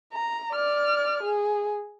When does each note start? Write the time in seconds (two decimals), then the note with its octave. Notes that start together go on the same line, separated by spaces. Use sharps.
0.13 A#5
0.52 D5 F6
1.23 G#4